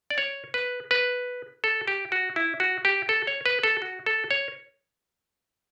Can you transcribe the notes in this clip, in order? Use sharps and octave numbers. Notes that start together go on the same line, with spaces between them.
D5
C#5
B4
B4
A4
G4
F#4
E4
F#4
G4
A4
C#5
B4
A4
F#4
A4
C#5